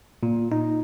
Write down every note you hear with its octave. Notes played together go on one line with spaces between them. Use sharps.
A#2
D#4